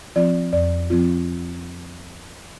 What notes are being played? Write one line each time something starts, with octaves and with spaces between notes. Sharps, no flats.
F3 C4 F4 D5
F2 D5
F3 C4 F4